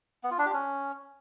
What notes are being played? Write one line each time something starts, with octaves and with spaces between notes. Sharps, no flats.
B3
F4
D4
G4
C#4